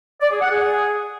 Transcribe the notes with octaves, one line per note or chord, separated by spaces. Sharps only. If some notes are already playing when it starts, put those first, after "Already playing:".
D5
G#4
F#5
G#4